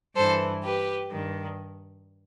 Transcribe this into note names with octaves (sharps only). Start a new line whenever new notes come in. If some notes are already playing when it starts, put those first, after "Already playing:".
G2 E3 A4 C5
G4 B4
G2 D#3